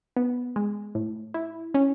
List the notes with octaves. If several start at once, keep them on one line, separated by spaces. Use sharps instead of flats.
B3
G#3
A2
E4
C#4